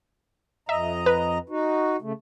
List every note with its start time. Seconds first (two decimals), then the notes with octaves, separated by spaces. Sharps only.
0.69 F2 D#5 E5 A#5
1.06 B4
1.49 D#4 F#4
2.02 C#3 A3